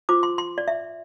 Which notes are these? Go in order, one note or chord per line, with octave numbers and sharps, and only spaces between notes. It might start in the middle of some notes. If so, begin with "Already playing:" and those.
F4 C5 D6
C6
C6
D5
E5